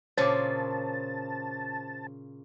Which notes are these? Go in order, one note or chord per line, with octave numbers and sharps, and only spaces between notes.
A#2 C#3 C5 C#5 A5 D6